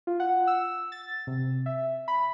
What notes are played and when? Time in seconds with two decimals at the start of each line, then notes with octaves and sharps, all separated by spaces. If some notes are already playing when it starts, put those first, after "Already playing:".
0.07 F4
0.20 F#5
0.47 E6
0.92 A6
1.27 C3
1.66 E5
2.08 B5